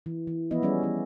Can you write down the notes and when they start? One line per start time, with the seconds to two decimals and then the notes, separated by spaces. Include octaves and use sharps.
0.06 E3
0.27 E3
0.51 E3 F3 B3 E4 D#5
0.62 G3 C#4 G#4 D5
0.83 E3 C#4